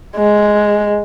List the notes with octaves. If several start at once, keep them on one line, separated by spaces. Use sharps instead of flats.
G#3